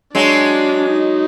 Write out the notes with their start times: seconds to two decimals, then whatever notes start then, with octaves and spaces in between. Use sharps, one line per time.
0.14 F#3 G#3 D4
0.91 D#4